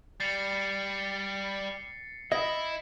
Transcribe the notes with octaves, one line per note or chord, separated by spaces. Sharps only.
G3 A6 C7 C#7
E4 D#5